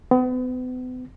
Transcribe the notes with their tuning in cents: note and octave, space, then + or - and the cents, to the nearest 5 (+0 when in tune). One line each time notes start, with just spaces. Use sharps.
B3 +40